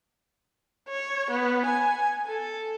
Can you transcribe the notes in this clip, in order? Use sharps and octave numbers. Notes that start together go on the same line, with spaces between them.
C#5
B3
G#5
A4